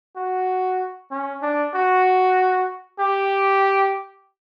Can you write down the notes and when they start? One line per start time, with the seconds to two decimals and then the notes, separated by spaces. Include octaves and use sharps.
0.17 F#4
1.11 C#4
1.43 D4
1.74 F#4
3.00 G4